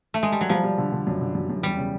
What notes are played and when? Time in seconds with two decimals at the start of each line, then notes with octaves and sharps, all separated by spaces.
0.14 A3
0.23 G#3
0.32 G3
0.41 F#3
0.49 F3 G3
0.64 G3
0.78 D3
0.92 D3
1.07 F#2
1.21 D3
1.35 F#2
1.50 F#2
1.63 E2 G3
1.78 C#3